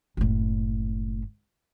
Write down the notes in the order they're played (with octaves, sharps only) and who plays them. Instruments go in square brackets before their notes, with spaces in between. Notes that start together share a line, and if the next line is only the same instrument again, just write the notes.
[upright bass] F#1 A2